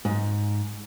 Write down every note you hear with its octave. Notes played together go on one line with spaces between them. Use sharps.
G#2